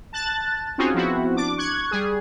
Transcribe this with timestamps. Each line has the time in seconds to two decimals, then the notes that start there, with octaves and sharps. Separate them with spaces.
0.13 A5 F#6 A6
0.78 C4 C#4 D#4 F4 F#4 G#4
0.94 F3 B3 C4 E4 F#4
1.37 D4 D6
1.57 C#6 F#6 G#6
1.91 G3 G#4